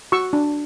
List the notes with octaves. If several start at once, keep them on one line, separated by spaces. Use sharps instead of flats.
F#4 C#6 E6
D4